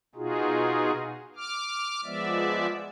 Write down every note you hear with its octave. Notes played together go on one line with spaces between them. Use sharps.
B2 D#4 F4 F#4 G#4
D6 F6
F3 G#3 B3 D5 E5